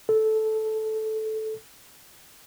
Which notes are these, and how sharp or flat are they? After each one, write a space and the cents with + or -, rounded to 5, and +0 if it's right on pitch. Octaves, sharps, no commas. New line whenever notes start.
A4 -10